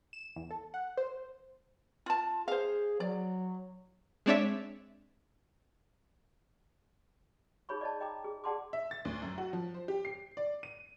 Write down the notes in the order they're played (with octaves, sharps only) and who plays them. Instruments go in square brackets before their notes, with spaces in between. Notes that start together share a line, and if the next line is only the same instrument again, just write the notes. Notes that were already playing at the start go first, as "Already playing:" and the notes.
[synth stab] E7
E2
A4
F#5
C5
[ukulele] F4 A5
[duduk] G#4 [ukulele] C5 F5
[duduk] F#3 [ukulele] D5
[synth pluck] G#3 C4 D4 C#5 D5 E5
[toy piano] D#4 G#4 C#5 B5 C#6
D5 D#5 A5
D#5 G5 A#5 D6
G#4
G#4 D5 F#5 A5 C6 D6
[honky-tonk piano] E5
A6
D2
F#2
F#4
F3
C5
G4
C7
D5
D#7